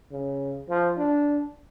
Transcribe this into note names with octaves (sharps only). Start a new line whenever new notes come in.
C#3
F3
D4